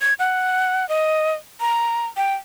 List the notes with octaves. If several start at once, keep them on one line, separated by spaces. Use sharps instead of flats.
G#6
F#5
D#5
A#5
G5